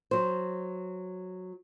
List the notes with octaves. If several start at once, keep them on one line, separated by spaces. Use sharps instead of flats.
F#3 C5